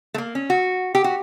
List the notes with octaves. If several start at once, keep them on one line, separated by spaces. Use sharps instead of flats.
A3
A#3
C#4
F#4
G4
F#4